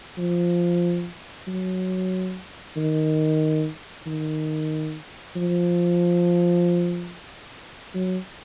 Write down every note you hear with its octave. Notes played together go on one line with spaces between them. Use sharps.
F3
F#3
D#3
D#3
F3
F#3